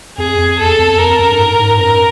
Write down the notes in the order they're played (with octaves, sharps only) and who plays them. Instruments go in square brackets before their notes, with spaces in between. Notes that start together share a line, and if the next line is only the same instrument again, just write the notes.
[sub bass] F2 [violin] G#4
[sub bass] F2
[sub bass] E2 [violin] A4
[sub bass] F2
[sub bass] F2 [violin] A#4
[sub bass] F2
F#2
G2
G#2
G#2
[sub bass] F#2 [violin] A#4